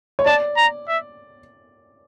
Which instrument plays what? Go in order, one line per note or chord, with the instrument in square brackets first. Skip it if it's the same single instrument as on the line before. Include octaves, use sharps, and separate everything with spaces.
[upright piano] C#5
[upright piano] D5 [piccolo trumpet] A5
[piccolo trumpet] A#5
E5